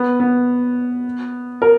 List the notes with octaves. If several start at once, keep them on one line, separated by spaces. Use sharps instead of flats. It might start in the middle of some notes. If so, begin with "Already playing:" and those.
Already playing: B3
B3
A#4